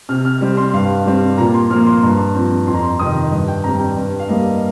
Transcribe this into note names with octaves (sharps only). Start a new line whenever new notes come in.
C3 F6
F6
G3 C4
C6
G2 F5
G3 C4
A#2 A#5
C6
F3 A#3 F6
C6
G2 A#5
F3 C4
F2 C6
A#5
C6
C3 D#3 D#6
G2
G5
G3 C4 A#5
G5
G2
F5
G3 A#3 D#5